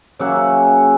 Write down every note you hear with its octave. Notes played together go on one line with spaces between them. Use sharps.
C#3 F#3 A#3 C#4 E5 F#5